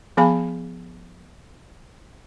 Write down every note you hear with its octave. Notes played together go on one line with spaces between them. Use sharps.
F3 B3 G#4 F5 G#5 B5